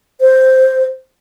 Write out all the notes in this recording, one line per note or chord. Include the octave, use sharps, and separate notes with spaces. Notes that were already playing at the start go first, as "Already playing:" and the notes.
C5